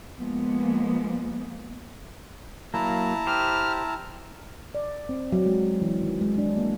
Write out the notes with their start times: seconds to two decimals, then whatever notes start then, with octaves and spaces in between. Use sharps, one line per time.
0.17 F3 G#3 A#3 B3
2.74 F#3 A#3 E4 A5 A#5
3.27 G4 C5 F6
4.75 D5
5.09 C4
5.32 F#3
5.46 G#3
5.82 E3
6.03 D#3
6.21 G#3
6.38 D4
6.57 A#3